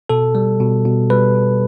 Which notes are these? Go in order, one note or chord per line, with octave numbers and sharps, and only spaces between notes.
B2 A4
G3
B2
B2
G3 B4
B2